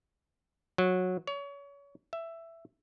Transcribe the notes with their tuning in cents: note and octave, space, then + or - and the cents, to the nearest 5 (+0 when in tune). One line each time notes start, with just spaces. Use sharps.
F#3 -15
C#5 +30
E5 +10